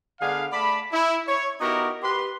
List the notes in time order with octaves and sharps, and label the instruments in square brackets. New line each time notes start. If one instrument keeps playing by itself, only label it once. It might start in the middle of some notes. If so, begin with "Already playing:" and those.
[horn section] D3 B3 D4 G#4 F5
A3 D5 A5 B5
E4
C#5
B3 D#4 E4 F#4 G4 A#4
G4 B4 C6